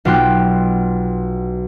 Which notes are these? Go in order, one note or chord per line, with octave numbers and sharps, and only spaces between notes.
B1 B2 F4 G5 C6 F#6